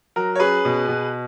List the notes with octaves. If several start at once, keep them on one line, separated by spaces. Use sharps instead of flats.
F#3 A#4
C#5
C#4 G#4 B4
B2
B2